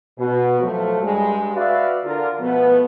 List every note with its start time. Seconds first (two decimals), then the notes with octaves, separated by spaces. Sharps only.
0.18 B2
0.60 F3 F#3 A3
1.01 G2 G#3
1.55 F#4 B4 D5 E5 F5
2.04 D3 F4 A#4
2.40 B2 F3 A3 B3